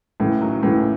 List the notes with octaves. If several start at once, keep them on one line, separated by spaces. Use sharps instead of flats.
A2 C#3 E3
D#3 F#3
A2 C#3 E3